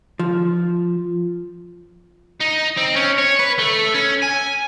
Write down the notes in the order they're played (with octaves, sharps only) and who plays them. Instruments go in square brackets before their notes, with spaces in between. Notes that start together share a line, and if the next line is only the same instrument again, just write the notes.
[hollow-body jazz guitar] F3
[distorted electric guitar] D#4
C4
C#4
C#5
B4
A3
C#4
G#5